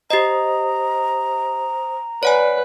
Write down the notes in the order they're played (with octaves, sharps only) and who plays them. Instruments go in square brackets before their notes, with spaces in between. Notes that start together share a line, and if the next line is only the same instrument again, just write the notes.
[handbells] G4 D#5 [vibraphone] C5 D#6 [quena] A#5
[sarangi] B4 [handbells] C#5 F#5 G#5 [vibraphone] D5